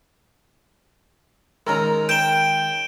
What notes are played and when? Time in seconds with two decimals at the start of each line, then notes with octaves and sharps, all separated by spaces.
1.67 D#3 G#3 C#4 A#4 A#5
2.09 G5 D7 E7 G7